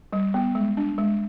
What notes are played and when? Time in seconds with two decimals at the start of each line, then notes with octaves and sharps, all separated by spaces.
0.13 G3
0.34 B3
0.55 G#3
0.77 D4
0.98 G#3